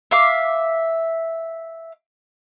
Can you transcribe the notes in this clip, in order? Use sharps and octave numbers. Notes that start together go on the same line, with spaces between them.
E5 F5 D6